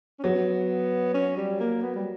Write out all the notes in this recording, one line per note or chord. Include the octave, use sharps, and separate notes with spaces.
C#4
F#3 B3
C#4
G3
A#3
B3
G3